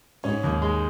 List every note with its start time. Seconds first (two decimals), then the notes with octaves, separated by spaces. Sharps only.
0.24 G#2 C#4
0.44 D#2
0.62 G#3